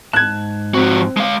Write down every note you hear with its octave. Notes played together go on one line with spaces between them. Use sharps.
G#2 A5 F#6 G#6
F3 C4 F#4
G#3 F5